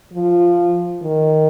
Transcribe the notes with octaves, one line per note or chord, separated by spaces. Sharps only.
F3
D#3